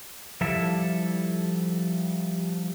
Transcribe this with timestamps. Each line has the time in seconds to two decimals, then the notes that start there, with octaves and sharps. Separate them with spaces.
0.41 F3 G3 E4 A4 E5